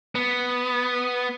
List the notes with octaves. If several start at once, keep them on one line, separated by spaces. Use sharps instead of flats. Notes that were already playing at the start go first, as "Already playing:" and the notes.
B3